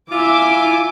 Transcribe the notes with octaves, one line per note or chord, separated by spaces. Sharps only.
E4 F4 E5 G#5 D6